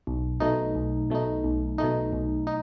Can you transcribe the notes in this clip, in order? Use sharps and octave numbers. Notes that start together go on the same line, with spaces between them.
B1
B2 A3 D#4
B1
B2 A3 D#4
B1
B2 A3 D#4
B1
D#4